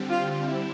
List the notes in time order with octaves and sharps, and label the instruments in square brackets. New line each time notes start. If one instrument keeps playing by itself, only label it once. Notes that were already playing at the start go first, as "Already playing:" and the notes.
Already playing: [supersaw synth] D3 G3 C4 G4
[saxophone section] F4
F4
E4